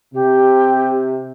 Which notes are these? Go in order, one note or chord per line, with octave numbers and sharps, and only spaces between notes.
C3 G4